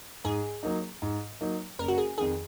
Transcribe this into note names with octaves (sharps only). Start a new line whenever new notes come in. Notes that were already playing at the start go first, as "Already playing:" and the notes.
G#2 G#4
F#3 A#3 D#4
G#2
F#3 A#3 D#4
F#1 A#4
F#4
G#4
F2 D#3 G#4